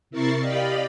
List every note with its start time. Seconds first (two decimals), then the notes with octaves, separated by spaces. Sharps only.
0.11 C3 E4 A#4 C#6 A6 C7
0.39 G4 D5 D#5 F5 B5